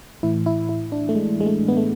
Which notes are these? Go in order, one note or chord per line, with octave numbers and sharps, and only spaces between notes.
A2 E3 E4
E4
E4
D4
A3
G#3
G#3
A3
B3
A3